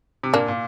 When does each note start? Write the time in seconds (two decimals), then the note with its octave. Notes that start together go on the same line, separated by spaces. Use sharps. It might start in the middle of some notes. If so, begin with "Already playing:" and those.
0.23 C3
0.33 A#2 A#3 D4
0.48 A#2